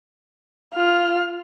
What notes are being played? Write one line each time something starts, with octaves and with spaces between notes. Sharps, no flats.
F4 F6